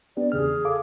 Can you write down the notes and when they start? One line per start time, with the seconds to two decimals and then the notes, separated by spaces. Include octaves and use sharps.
0.17 B3 D4 G4 D5
0.32 E2 C#3 G#4 F6
0.65 A4 F5 D6